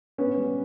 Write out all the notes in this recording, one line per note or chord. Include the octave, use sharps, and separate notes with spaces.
B3 C#4
G3